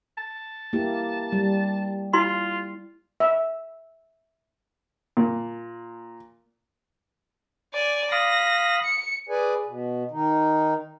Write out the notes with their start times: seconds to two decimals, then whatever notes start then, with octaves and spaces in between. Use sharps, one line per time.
0.18 A5
0.73 A#3 E4 G4
1.32 G3
2.13 E4 F4 C6
3.20 E5
5.17 A#2
7.74 D5 G#5
8.12 F5 B5 D#6 A#6
8.85 C#7
9.29 G#4 B4 D5 G#5
9.66 B2
10.11 D#3 D#4